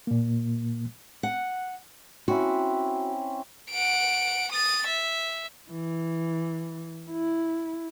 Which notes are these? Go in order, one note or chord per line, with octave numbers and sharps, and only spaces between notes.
A#2 A#3
F#5
C4 C#4 E4 F#4
F#5 D7
D#6 A6
E5
E3
E4